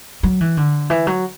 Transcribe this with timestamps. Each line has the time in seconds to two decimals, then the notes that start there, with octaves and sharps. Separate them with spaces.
0.23 F#3
0.41 E3
0.57 D3
0.90 E3
1.07 F#3